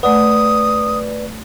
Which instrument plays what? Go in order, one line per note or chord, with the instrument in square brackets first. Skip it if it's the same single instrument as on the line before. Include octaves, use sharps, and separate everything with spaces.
[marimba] A3 F#5 [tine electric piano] B4 D5 [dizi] D#6